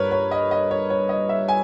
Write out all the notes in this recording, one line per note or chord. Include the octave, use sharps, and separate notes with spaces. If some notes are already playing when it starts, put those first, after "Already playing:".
Already playing: G2 A#4 B4 C#5
C#5
D#5
D#5
C#5
C#5
D#5
E5
G#5